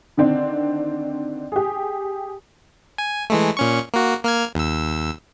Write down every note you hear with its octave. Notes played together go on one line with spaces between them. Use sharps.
D3 D#3 C4 D4
G4 G#4
G#5
E3 G#3 A3
A#2 C#4 C#6
A#3 F#4
A#3 F6 G#6
D#2 E6